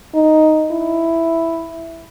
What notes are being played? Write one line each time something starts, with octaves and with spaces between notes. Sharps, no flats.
D#4
E4